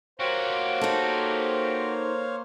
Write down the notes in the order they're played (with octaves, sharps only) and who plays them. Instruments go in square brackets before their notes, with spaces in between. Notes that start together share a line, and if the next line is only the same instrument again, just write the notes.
[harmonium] A#3 C5 [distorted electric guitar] F#4 G4 [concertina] C#5 F5
[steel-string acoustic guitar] D#4 A4